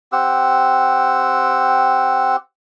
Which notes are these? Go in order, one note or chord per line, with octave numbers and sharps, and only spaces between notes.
C4 G4 F#5 E6